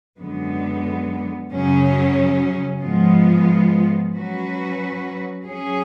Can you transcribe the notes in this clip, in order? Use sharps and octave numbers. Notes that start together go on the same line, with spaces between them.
F#2 D3 G#3 B3
F#2 C#3 F#3 C#4
G#2 F3 G#3 B3 F4
F#3 C#4 F#4 B4
F#3 C#4 G#4